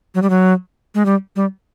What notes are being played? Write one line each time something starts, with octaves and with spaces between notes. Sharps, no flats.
F#3
G3
F#3
G#3
G3
G3